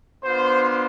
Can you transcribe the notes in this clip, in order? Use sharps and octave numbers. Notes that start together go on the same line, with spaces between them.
B3 D4 F4 C5